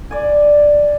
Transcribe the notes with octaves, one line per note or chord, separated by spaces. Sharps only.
D5 G#5